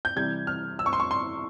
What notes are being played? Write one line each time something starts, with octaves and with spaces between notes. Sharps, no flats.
G6
C3 E3 G3 G#6
F6
E6
C#6
C6
C#6
C6